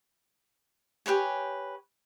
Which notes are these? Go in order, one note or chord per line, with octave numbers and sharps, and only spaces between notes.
G4 B4 C#5 G#5